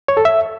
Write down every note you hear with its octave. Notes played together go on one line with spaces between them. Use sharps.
C#5
A4
E5